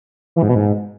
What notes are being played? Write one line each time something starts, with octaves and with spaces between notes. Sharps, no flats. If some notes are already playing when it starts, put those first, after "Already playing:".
E3
G#2
B2
G#2